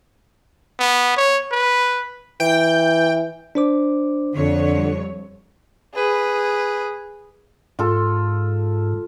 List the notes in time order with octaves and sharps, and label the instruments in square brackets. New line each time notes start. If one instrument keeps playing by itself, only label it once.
[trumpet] B3
C#5
B4
[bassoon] E3 [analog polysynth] G5
[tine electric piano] D4 C5 D6
[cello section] F2 C#5 [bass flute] D3
[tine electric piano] G3
[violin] G#4 B4
[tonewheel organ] G#2 [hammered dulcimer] F4 A4